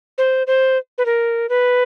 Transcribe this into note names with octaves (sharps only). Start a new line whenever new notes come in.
C5
C5
B4
A#4
B4